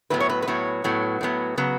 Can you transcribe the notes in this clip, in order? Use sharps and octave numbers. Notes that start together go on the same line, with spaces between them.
A2 F#3 B3 B4
C#5
B4
B4
A2 F#3 B3 C#5
A2 F#3 B3
A2 F#3 B3
C#3 F#3 B3